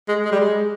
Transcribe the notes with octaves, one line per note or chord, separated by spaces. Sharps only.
G#3
G#3
G3
G#3